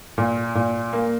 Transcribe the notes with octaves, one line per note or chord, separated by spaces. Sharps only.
A#2
A#2
A#3